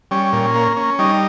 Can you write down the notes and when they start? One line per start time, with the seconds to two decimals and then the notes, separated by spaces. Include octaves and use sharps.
0.11 G3 C#4
0.33 A#2
0.55 A#3
0.77 C#4
0.99 G3 D#4